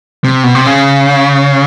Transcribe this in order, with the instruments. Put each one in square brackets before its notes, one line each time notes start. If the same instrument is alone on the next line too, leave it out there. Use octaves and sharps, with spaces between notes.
[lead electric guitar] C3
B2
C3
C#3